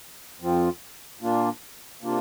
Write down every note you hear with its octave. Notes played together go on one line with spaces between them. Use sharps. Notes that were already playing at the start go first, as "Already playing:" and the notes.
F2 F3 C4 F4
A#2 A#3 D4 F4
C3 A#3 D4 F4